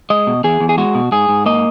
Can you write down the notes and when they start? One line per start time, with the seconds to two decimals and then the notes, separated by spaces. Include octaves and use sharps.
0.10 G#3 D#5
0.27 B2
0.44 E2 G#4
0.60 E2
0.69 G#4
0.78 G#3 F#4
0.95 B2
1.12 G#2 G#4
1.29 G#2
1.46 A#3 D#5